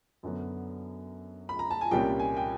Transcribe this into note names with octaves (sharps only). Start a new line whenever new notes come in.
F#2 D3 F#3 B3
B5
A#5
A5
G#5
C2 A#2 G3 A#3 C#4 G5
G#5
G5